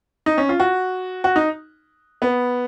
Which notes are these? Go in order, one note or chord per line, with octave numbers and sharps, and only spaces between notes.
D#4
C#4
F4
F#4
F#4
D#4
B3